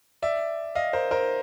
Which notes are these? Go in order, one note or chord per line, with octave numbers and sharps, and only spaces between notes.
D5 E5
D#5 F5
A#4 C5
A#4 C5